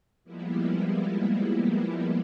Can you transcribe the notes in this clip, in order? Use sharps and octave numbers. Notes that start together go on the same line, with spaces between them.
F3 G3 G#3 A#3 B3 E4